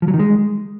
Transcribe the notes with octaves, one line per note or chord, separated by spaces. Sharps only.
F3
F#3
D#3
G#3